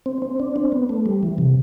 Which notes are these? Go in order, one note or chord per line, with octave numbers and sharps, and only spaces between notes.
C4
C4
D4
C4
B3
A3
G3
E3
C3